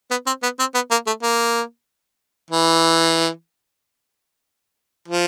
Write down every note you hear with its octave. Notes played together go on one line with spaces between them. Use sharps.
B3
C4
B3
C4
B3
A#3
A3
A#3
E3
F3